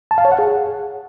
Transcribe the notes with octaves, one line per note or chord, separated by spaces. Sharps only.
A5
F5
C#5
F#5
G#4